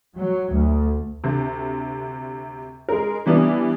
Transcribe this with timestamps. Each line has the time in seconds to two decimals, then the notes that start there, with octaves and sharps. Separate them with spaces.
0.16 F#3
0.53 D2
1.24 D2 C3
2.89 G#3 A#4
3.26 E3 G3 B3 D4 E4